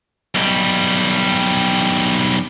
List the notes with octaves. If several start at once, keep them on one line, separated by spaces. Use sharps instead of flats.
B1 G3